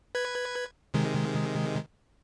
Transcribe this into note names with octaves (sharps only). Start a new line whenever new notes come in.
B4 G#6
C3 D#3 G#3